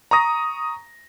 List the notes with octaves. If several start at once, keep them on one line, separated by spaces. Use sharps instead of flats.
A#5 C#6 D#6 A#6